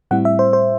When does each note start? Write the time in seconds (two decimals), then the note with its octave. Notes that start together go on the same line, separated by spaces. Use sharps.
0.11 A2 G3 C4 E4 F#5
0.25 E5
0.39 C5
0.53 C5